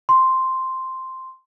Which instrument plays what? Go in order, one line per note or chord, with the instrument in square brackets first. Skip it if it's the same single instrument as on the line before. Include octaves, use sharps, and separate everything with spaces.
[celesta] C6